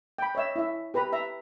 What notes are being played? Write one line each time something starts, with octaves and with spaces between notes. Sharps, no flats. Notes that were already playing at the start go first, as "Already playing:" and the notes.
G5 B5
C#5 D#5 E5 E6
E4 E5
G4 B4 A#5 B5
E5 A#5